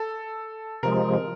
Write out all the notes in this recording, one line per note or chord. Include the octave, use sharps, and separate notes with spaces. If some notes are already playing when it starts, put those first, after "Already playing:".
Already playing: A4
C3 F3 G#3 A#4